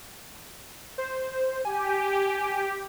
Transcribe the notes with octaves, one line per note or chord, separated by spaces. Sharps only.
C5
G4 G#5